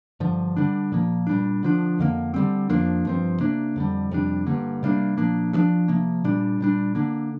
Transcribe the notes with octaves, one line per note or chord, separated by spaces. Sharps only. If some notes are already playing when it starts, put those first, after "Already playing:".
G2 D3 F3
D3 G3 D4
A#2 F3 A#3
A#2 G3 D4
D3 F3 D4
F2 D3 A#3
D3 G3 C4
F2 F3 A#3 D4
G2 F3 C4
C3 A#3 D4
F2 D3 G3
F2 C3 G3 D4
G2 D3 A#3
C3 G3 A#3 D4
A#2 F3 A#3 D4
G2 F3 D4
C3 F3 A#3
A#2 G3 D4
A#2 G3 D4
D3 A#3 D4